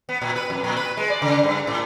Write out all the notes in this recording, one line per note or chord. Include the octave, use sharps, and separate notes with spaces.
B3
A#2
B4
F2
A#2
B4
G#3
D5
C#3
G2
A2